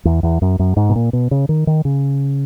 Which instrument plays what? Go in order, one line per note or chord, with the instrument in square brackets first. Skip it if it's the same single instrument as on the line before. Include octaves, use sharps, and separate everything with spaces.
[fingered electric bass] E2
E2
F#2
F#2
G#2
B2
A#2
B2
C#3
D#3
D#3
C#3